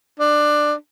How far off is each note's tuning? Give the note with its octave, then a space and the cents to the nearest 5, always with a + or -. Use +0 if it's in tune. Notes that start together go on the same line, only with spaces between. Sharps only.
D4 +15